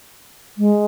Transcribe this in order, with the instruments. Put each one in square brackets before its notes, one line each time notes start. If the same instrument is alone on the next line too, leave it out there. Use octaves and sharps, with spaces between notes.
[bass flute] G#3